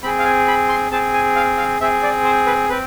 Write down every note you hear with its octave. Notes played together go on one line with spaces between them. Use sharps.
C4 G#4 B5
F5
G#5
B5
C6
C4 G#4 A5
G#5
F5
F5
C4 G#4 E5
D5
C5
B4
C4 B4